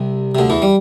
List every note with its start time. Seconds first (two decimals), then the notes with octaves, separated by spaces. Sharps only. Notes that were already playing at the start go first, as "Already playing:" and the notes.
Already playing: C2 C3
0.35 C3
0.38 D2 D3
0.50 E2 E3
0.62 G3